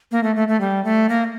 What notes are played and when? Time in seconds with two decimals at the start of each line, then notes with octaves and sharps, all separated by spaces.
0.12 A#3
0.23 A3
0.36 A3
0.48 A3
0.61 G3
0.85 A3
1.09 A#3